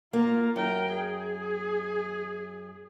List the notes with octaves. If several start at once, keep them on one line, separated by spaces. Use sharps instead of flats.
A#3 F4 A#5
F#2 A#4 G5
G#4